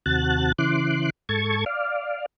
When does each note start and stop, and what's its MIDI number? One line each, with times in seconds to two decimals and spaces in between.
0.06 0.52 39
0.06 0.52 48
0.06 0.52 66
0.06 0.52 81
0.06 0.52 90
0.06 0.52 93
0.58 1.10 49
0.58 1.10 52
0.58 1.10 84
0.58 1.10 86
0.58 1.10 90
1.29 1.65 44
1.29 1.65 69
1.29 1.65 81
1.29 1.65 85
1.29 1.65 92
1.66 2.26 74
1.66 2.26 77